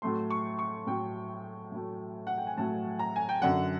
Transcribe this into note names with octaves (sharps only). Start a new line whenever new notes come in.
A2 F#3 A3 C6
C#6
C#6
A2 F#3 A3 G5
A2 F#3 A3
F#5
G5
G#5
A2 F#3 A3 A5
A#5
G#5
G5
F#2 D3 F#3 F#5